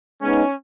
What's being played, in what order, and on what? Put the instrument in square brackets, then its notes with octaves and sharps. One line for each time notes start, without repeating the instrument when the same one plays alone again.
[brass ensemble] G#3 B3 D#4 [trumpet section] C#4